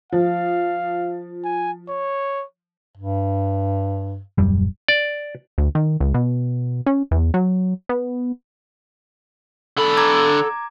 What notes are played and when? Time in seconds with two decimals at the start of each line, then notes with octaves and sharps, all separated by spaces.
0.12 F3 F5
1.44 G#5
1.89 C#5
2.97 G2
4.38 D#1 F#2 G3
4.88 D5
5.58 D2
5.75 D#3
6.00 C#2
6.14 B2
6.86 C#4
7.11 E2
7.34 F#3
7.89 B3
9.77 D3 A4 B5
9.97 A#5 D6 G#6